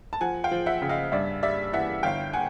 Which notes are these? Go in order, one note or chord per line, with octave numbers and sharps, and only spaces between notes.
A5
F3 F#5 G#5
F5 G5
F3
E5 F#5
C#3
D#5 F5
G2 D5 E5
G3 D5 E5
E3 E5 F#5
G1 F5 G5
F#5 G#5